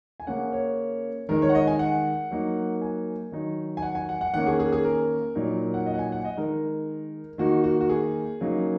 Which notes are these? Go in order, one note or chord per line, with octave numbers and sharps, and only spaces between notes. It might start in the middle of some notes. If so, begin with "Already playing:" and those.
G#5
C#3 A#3 C#4 F#5
C#5
D#3 G#3 D#4 A#4
C#5
F#5
D#5
G#5
F#5
F#3 A#3 D#4
G#5
D#3 F#3 D#4
G#5
F#5
G#5
F#5
F#5
D#3 A#3 C#4 F#5
G#4
G#4
G#4
A#4
A#2 F#3 D#4
F#5
D#5
F#5
G#5
F#5
D#5
D#3 G#3 D#4 A#4
D#3 A#3 D#4 F#4
F#4
F#4
G#4
C#3 F#3 A#3 D#4